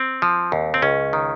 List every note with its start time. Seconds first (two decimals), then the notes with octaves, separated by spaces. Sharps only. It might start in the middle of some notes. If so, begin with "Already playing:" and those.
Already playing: C4
0.22 F3
0.52 D#2
0.74 C4
0.82 C#2 C#4
1.13 D#3